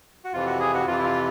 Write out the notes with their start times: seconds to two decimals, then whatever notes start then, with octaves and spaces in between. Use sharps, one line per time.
0.24 F#4
0.33 F2 C3 E3 F4
0.46 F#4
0.60 G#4
0.74 F#4
0.86 F2 C3 E3 F4
0.99 E4
1.04 F4